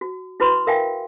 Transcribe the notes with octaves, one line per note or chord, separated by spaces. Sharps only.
F#4
E4 F#4 B4 B5 C6
A#4 E5 F5 G5 G#5